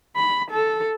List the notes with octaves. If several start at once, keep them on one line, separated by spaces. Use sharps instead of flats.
B5
A4